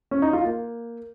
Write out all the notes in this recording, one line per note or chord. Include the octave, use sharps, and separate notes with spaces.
C#4
D#4
F4
A#3